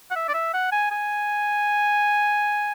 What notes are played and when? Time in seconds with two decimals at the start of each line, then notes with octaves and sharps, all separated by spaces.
0.11 F#5
0.16 E5
0.28 D5
0.34 E5
0.54 F#5
0.72 G#5
0.91 G#5